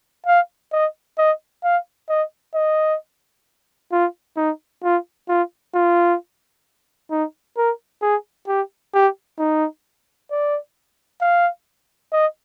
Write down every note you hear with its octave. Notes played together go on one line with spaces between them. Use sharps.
F5
D#5
D#5
F5
D#5
D#5
F4
D#4
F4
F4
F4
D#4
A#4
G#4
G4
G4
D#4
D5
F5
D#5